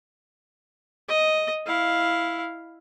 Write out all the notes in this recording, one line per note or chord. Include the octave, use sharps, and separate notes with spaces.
D#5
E4 F5